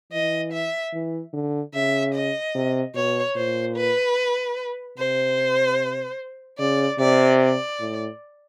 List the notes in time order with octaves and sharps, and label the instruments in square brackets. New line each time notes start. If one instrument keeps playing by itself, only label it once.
[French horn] E3 [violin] D#5
[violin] E5
[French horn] E3
D3
[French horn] C#3 [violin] E5
[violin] D#5
[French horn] C3
[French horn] B2 [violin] C#5
[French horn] A#2 [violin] C5
[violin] B4
[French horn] C3 [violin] C5
[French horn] C#3 [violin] D5
[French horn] C3 [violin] D5
[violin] D5
[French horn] A2